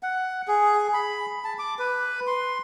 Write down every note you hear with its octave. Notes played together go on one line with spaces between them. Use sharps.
F#5
G#4
B5
A5
D6
B4
C6